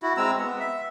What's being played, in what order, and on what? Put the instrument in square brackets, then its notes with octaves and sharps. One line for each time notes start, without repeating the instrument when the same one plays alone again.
[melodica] E4 F#4
G#3 C4 A#5 E6
B3
E5